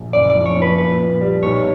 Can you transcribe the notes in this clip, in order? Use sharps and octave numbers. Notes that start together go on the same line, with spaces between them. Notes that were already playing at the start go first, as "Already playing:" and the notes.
Already playing: A#1
F#1 D5
D5
F3
C#5
F3
B4
A#2 B4
A#2
G3
B1 C#5